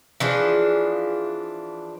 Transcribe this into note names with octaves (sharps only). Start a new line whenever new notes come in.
E3 F3 D4 G#4